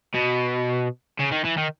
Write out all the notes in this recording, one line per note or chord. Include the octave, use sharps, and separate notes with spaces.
B2
C#3
D#3
E3
D#3